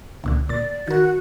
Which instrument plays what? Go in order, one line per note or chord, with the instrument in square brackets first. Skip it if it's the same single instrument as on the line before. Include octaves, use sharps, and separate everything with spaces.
[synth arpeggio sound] C#2 A#2 D3
[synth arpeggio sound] A#2 A6 [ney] D5
[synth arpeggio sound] D#3 A#4 [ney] F#4